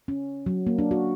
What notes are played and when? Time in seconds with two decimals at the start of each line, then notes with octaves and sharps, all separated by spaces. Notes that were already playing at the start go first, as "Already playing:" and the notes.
0.08 C#4
0.46 F#3
0.67 A#3
0.78 D4
0.91 F#4